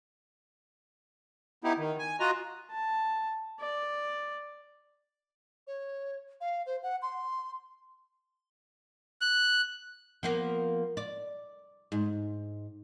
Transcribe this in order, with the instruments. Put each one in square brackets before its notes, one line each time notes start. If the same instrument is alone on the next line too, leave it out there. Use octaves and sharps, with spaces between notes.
[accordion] B3 D#4 E4 G4
D#3
G#5
F4 F#4 D#5 A#5
[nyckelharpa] A5
D5
[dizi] C#5
F5
C5
F#5
C6
[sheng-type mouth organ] F#6
[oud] F3 A#3 B3
D5
G#2